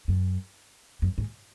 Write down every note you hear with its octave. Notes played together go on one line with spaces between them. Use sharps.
F#2
F#2
G#2